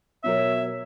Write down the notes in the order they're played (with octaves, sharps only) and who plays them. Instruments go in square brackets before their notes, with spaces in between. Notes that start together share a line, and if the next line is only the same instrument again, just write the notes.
[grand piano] B2 F#3 A#4 [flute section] C#5 [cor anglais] E5